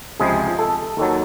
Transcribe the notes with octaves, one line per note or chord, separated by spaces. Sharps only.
C#2 C3 F3 G#3 G#4
A4
D#2 D#3 F#3 A4